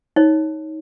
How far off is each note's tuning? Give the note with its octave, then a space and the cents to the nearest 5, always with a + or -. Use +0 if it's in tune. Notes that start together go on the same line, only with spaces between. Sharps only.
D#4 +25 C#5 +0